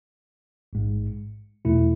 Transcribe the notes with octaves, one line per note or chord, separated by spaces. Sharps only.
A1 G#2 G#3
E2 B2 A3 E4